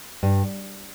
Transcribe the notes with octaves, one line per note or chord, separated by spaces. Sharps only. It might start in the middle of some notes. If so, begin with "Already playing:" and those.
G2